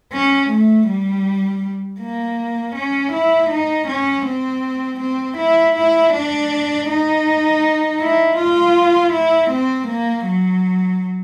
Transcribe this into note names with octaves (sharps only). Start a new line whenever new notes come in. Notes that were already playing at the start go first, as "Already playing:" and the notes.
C#4
A3
G3
A#3
C#4
E4
D#4
C#4
C4
C4
E4
E4
D4
D#4
E4
F4
E4
C4
A#3
F#3